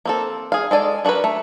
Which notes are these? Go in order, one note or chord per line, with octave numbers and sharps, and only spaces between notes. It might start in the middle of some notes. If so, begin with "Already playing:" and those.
A#3 C4 A4
G#4 F5
G#3 A4 D5 G#5
D4 F#4 G#4 A#4 B4
A3